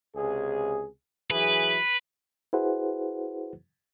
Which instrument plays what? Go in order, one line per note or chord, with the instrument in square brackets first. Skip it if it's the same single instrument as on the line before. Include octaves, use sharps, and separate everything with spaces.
[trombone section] C#2 C3 G#4
[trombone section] E3 F#3 G#4 [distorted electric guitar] B4
[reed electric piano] E4 F#4 G#4 B4 C5 F#5